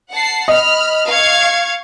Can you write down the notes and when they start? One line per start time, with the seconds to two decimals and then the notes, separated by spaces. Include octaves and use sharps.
0.11 F#5 A5 C7
0.48 D#5 B5 F6
1.06 F5 C#6 G#6